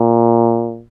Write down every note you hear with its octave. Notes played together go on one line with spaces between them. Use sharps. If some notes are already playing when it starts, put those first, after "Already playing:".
Already playing: A#2